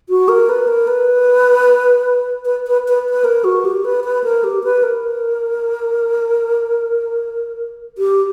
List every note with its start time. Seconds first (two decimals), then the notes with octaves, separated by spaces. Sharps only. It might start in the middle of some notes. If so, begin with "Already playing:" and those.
0.09 F#4
0.28 A#4
0.49 B4
0.68 A#4
0.87 B4
2.45 B4
2.67 B4
2.88 B4
3.09 B4
3.24 A#4
3.44 F#4
3.65 G4
3.85 B4
4.04 B4
4.24 A#4
4.44 G4
4.64 B4
4.83 A#4
7.98 G4